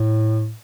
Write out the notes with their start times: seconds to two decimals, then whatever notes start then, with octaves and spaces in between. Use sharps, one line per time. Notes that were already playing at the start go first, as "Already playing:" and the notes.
Already playing: A2